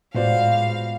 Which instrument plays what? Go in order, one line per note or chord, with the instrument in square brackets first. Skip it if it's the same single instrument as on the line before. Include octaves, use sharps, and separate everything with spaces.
[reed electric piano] A2 [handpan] G#3 B3 F4 [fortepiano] F#4 C5 D5 [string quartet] F5